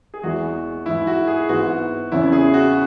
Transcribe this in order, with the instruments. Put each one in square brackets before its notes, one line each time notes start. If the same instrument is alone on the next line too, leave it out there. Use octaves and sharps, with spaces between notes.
[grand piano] G#4
[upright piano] E2 E3 G#3 [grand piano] F#4
[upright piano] G#2 E3 G#3 [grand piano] E4
[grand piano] F#4
G#4
[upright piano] G#2 E3 B3 [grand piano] F#4
[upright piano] E2 C#3 E3 C#4 [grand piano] E4
[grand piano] G#4
F#4